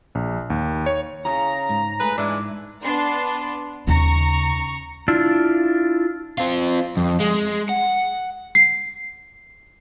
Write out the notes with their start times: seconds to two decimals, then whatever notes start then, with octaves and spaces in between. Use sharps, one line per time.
0.15 A#1
0.50 D#2
0.86 C#5
1.25 C#3 E4 G#4 C#5 A#5
1.69 G#2
2.00 A3 G#4 B4
2.18 G#2 E3 G#3 D4 E5
2.82 B3 D4 C6
3.87 D#2 C#3 A#5 C#6
5.08 D4 E4 F4
6.38 C4 F4
6.97 F2
7.20 G#3
7.69 F#5
8.55 C7